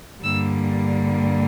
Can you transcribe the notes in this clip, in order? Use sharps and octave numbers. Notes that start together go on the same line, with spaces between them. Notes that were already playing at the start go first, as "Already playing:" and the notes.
G2 D3 G3 A#3 E6